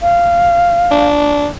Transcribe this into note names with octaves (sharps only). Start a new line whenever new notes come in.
F5
D4